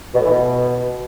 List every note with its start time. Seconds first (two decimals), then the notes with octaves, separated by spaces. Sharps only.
0.14 B2
0.20 A2
0.25 E3
0.31 B2